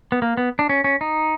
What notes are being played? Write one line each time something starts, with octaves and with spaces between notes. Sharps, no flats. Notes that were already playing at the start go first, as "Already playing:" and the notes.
B3
A#3
B3
D4
C#4
C#4
D#4